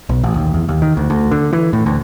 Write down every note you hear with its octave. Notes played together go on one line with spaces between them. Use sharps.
B1
A1
D#2
E2
D#2
D#3
D2
D2
D3
E3
A2
D2